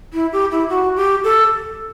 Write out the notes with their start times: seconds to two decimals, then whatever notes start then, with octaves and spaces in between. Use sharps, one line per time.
0.13 E4
0.33 G4
0.51 E4
0.70 F#4
0.96 G4
1.24 A4